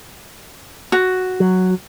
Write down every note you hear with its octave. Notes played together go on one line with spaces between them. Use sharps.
F#4
F#3